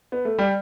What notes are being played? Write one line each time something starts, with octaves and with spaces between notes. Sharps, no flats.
B3
A3
G3